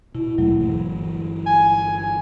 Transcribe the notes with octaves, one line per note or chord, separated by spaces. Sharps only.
B2 E4
D#2 B2 F#3 A3
G1 E3
G#5